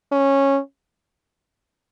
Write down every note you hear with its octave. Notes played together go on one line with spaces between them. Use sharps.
C#4